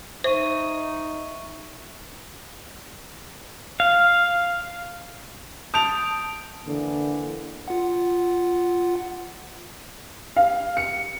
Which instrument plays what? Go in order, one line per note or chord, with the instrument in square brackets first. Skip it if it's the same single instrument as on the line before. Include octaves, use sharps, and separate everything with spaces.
[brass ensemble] D#4 [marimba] C5 [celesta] E5 C#6 D#7
[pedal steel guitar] F5
[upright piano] A5 F7 [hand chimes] D#6 G6 D7
[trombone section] D3 E3 A#3
[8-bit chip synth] F4 F#5
[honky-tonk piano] F5
C#7